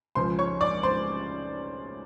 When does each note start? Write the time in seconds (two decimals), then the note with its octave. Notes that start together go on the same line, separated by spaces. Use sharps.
0.15 C#2 C#3 F3 C5 C6
0.39 C#5 C#6
0.61 D5 D6
0.83 C5 C6